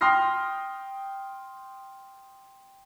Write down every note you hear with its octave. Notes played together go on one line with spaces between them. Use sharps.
G5 C6 D#6 F6 A#6 C7